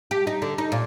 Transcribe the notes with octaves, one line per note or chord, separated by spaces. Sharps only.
G4
D#4
D3
D#4
A#2